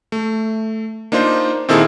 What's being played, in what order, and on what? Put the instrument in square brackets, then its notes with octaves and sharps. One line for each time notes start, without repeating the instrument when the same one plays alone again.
[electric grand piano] A3
A#3 D4 D#4 F4 C5
A#2 D#3 C4 E4 G#4 A4